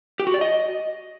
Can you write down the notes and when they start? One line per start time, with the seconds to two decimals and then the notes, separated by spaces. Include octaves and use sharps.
0.20 G4
0.27 F#4
0.34 D5
0.41 D#5